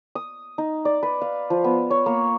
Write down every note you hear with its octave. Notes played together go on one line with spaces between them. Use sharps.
D#6
D#4
D5
B4
F5
F3
B3
C#5
A#3